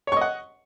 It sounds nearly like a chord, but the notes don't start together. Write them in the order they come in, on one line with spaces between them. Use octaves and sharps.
C#5 C#6 D#5 F#5